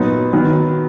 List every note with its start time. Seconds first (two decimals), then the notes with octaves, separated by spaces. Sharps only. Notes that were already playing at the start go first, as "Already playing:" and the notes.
Already playing: A#2 F#3 B3 D#4
0.33 D#3 F#3 B3